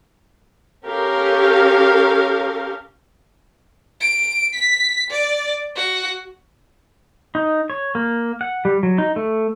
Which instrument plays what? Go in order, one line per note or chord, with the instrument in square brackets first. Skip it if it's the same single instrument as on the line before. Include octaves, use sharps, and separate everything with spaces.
[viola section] C#4 G4 A4 A#4 F5
[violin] D7
B6
D5
F#4
[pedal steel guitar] D#4
C#5
A#3
F#5
G3
F#3
D#4
A3